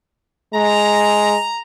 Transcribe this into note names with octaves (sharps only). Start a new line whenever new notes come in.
G#3 A#5